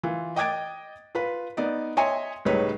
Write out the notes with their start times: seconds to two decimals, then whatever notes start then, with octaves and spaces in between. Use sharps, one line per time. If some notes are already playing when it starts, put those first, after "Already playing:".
0.03 E3 F4
0.36 D#5 G5 D6 G#6 A6 D7
1.15 F4 B4 B5
1.57 B3 D#4 D5
1.97 C#5 D#5 E5 G#5 C6 C#7
2.45 C#2 A2 G3 D#4 B4 C#5